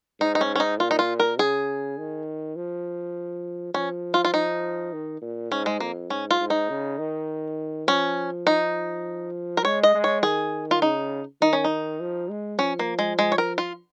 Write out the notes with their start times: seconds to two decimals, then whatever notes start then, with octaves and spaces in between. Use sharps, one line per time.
0.21 G#2 D#4
0.35 D#4
0.41 C#4
0.55 C#4
0.60 D#4
0.80 A#2 F4
0.91 D#4
0.99 F4
1.20 A#4
1.38 C#3 G#4
1.98 D#3
2.56 F3
3.74 F3 C#4
4.14 F4
4.25 F4
4.34 D#4
4.93 D#3
5.21 A#2
5.51 G#2 C#4
5.66 G#3
5.80 F2 A#3
6.10 G#2 C#4
6.31 F4
6.40 G#2
6.50 D#4
6.70 C#3
6.98 D#3
7.87 F3 C#4
8.47 D#4
9.57 A#4
9.64 G#3 C#5
9.83 D#5
9.94 G#3
10.04 C#5
10.23 D#3 G#4
10.71 F4
10.82 C#3 D#4
11.41 D#3 D#4
11.53 C#4
11.64 D#4
12.00 F3
12.30 G#3
12.59 F3 C#4
12.79 A#3
12.99 G#3
13.19 G#3
13.32 C#5
13.38 A#4
13.58 F4